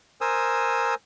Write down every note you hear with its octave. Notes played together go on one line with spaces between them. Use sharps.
A#4 C5 G#5 D#6 E6